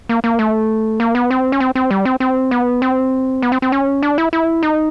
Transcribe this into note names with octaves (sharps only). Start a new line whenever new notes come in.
A#3
A#3
A3
A#3
B3
C4
C#4
C4
C4
G3
C4
C4
B3
C4
B3
C4
C4
C#4
D4
E4
E4
D#4